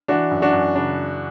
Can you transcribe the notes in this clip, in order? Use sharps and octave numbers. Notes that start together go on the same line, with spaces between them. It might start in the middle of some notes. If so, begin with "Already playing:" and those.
E3 D4 F#4
F#2
D4 F#4
F#2
C#3 D4